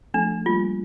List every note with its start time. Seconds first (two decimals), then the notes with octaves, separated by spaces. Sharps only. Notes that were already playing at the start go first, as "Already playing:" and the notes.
0.14 F3 A3 D4
0.46 G3 A#3 F4